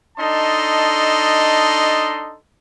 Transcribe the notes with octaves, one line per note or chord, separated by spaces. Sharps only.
D4 D#4 A4 D#5 A5 C6